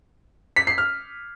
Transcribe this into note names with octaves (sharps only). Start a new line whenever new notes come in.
B6
C7
F6